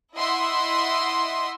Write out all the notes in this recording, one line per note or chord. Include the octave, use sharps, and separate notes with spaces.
E4 D#5 E5 F#5 C6